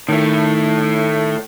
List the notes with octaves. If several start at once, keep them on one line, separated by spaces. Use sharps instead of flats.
A2 D#3 A3